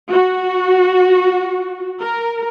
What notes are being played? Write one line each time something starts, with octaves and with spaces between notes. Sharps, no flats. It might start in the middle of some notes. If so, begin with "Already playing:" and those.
F#4
A#4